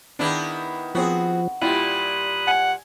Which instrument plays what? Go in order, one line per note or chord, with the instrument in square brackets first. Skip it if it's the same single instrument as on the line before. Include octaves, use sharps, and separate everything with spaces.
[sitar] D#3 B3 E4 [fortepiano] D4 G#4
[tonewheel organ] F3 [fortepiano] B3 C4 G#4 [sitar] F#4
[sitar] A#2 G3 [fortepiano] E4 F4 G4 [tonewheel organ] B5 D#6 F#6
[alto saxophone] F#5 [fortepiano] G#5